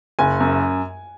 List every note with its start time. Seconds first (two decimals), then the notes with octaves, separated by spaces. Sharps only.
0.19 F#1 G#5
0.40 F#2